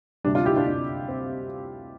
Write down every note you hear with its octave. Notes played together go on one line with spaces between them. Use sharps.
D2 C3 G3 D4
D4 F4
E4 G4
D4 F4
D4
C4